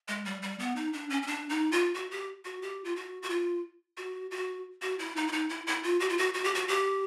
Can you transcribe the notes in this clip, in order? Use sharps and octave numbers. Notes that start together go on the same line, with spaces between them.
G#3
G3
G3
B3
D#4
D4
C#4
C#4
D4
D#4
F4
F#4
G4
F#4
G4
F4
F#4
F#4
F4
F#4
F#4
F#4
E4
D#4
E4
D#4
E4
E4
F4
F#4
F4
F#4
F#4
G4
F#4
G4